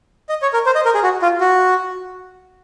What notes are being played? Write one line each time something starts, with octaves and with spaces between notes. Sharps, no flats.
D#5
C#5
A#4
C5
D#5
A#4
G#4
F#4
F4
F#4